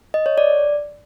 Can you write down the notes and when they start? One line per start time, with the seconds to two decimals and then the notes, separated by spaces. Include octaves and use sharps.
0.14 D#5
0.26 C#5
0.38 D5